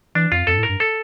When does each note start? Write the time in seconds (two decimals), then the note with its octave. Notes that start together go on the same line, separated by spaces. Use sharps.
0.15 E3 D4
0.32 F2 F4
0.47 F2 A4
0.54 G2
0.58 A2
0.63 A#4
0.69 G2
0.80 A4